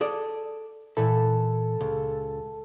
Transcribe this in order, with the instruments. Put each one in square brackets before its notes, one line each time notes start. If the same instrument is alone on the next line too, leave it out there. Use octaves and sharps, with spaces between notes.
[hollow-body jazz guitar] G#4 A4 D5
[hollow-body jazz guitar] A#2 E3 E4 [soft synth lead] A4
[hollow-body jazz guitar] C#2